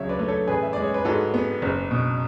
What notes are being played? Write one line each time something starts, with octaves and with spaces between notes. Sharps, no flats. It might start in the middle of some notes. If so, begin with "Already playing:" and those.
Already playing: C#2 C#3 F#3 C#5 E5
B4 D5
A3
A4 C#5
A1 G#4 B4
E5
G#3 D5
C#5
B4
G#2 F#4 A4
B3
F#1
B2